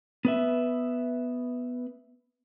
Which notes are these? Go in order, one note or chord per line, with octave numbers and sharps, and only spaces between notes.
B3 B4 E5